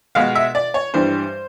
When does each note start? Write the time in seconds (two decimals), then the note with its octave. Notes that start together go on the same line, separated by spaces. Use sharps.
0.15 B2 G#3 F5
0.35 E5
0.55 D5
0.74 C#5
0.94 G2 E3 G3 C5